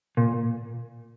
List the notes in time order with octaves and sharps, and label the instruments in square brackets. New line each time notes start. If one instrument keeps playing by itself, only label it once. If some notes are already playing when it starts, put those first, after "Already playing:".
[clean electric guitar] A#2